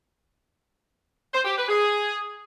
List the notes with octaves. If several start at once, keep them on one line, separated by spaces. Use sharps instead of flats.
C5
G4
B4
G#4